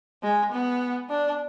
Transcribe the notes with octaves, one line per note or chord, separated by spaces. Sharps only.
G#3
B3
D4